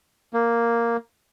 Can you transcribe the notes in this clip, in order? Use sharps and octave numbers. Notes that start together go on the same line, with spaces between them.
A#3